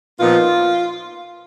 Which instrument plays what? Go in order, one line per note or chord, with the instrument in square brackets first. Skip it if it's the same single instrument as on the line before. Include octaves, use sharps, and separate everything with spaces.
[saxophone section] A#2 F3 B3 D#4 F4